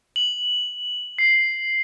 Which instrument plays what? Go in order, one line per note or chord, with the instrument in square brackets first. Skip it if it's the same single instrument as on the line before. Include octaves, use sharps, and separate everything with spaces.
[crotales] F#7
C7